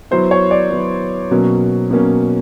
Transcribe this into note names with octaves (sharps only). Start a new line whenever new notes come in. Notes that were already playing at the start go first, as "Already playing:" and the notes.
F#3 B3 E4 C5
C#5
D5
F#3 B3 E4
B2 F#3 A#3 C#4
B2 F#3 A#3 C#4